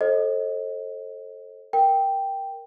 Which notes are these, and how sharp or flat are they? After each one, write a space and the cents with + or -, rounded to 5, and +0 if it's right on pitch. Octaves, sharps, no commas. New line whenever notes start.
A4 +0 C5 +35 D#5 +5
A#4 +0 G5 +0